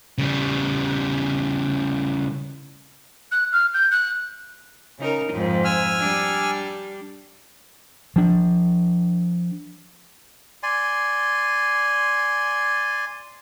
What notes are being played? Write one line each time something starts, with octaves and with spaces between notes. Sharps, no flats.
C#3 G3
F#6
F6
G6
F#6
C#3 D#4 A#4
F2 G#2
G#5 E6 F6
G3 D4
F3 D4
D5 G#5 C6